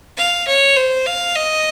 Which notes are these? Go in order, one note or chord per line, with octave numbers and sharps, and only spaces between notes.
F5
C#5
C5
F5
D#5